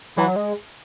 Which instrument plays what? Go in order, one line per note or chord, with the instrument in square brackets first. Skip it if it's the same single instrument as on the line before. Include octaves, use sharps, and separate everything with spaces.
[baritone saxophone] E3 [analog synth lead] F#3
[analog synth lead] G#3